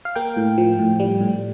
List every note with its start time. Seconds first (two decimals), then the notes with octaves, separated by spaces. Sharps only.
0.05 F5
0.16 A#3 G5
0.37 A2
0.58 F3
0.79 A2
1.00 G3
1.21 A2